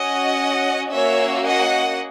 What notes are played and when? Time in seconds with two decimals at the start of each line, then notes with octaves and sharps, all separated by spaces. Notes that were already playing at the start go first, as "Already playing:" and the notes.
Already playing: C#4 F#4 D#5 F#5
0.92 A#3 C#4 F#4 C#5 E5
1.46 D#5 F#5